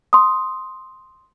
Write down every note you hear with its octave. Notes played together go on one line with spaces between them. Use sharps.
C6 D#6